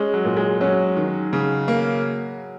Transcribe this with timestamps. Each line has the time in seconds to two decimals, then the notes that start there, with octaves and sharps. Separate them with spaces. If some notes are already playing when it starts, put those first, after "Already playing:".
Already playing: G#3 C#4
0.14 F#3
0.25 A#2
0.37 G#3
0.61 F#3 C#4
0.97 D#3
1.33 C#3
1.68 A#3